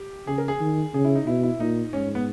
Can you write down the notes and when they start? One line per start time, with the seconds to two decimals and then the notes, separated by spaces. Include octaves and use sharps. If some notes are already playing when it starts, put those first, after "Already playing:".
Already playing: G4
0.27 C#3 G#4
0.38 A#4
0.48 G#4
0.60 D#3
0.94 C#3 G#4
1.05 E4
1.15 D#4
1.27 B2 E4
1.43 E4
1.59 A#2 D#4
1.93 G#2 C#4
2.15 B3